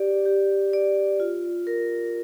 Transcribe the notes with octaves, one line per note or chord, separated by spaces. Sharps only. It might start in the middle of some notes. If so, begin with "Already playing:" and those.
Already playing: G4 D5
G4
D5
F4
A#4